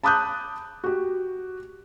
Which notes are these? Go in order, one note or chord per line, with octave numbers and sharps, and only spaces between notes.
A5 B5 D6 D#6 F#6 G6
F#4 G4